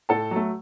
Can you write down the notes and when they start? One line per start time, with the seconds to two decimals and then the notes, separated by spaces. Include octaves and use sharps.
0.09 A2 A4 A5
0.31 F#3 A3